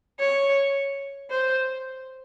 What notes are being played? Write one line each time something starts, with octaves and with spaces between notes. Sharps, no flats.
C#5
C5